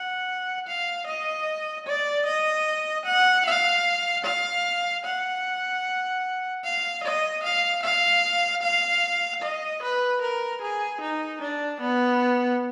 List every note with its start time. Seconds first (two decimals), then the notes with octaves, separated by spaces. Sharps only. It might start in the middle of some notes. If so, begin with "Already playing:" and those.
Already playing: F#5
0.67 F5
1.07 D#5
1.86 D5
2.26 D#5
3.05 F#5
3.46 F5
4.24 F5
5.04 F#5
6.64 F5
7.03 D#5
7.43 F5
7.82 F5
8.62 F5
9.42 D#5
9.82 B4
10.21 A#4
10.62 G#4
11.01 D#4
11.41 D4
11.81 B3